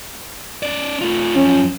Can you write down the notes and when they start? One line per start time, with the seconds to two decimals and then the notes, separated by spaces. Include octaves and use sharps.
0.63 C#4 D5
1.01 A3 F4
1.36 F#2 F3 C#4